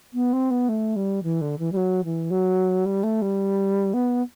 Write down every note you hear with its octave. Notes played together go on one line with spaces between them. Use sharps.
B3
C4
B3
A3
G3
E3
D3
E3
G3
F#3
E3
F#3
G3
A3
G3
B3